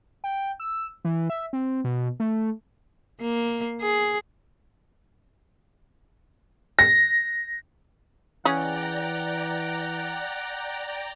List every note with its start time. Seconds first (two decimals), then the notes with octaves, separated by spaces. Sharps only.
0.24 G5
0.60 E6
1.05 E3
1.30 E5
1.53 C4
1.84 B2
2.20 A3
3.21 A#3
3.81 G#4
6.79 A#6
8.45 C#3 E3 C#4 G#4 D5 F#5 G5 A#5